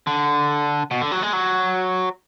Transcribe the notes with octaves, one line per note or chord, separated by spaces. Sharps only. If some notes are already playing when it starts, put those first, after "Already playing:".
D3
B2
D3
F#3
G#3
F#3